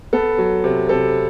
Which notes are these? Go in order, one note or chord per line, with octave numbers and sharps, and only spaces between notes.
B3 A4
F#3
C3
C3 A4